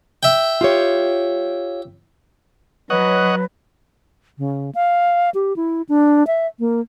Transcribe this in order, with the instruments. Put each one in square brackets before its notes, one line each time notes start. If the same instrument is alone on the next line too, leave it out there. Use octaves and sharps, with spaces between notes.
[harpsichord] E5 G5
[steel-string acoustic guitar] F4 G4 C#5
[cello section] F#3 [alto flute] B4 [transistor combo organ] C#5 D#5 F#5
[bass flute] C#3
F5
G4
E4
D4
E5
A#3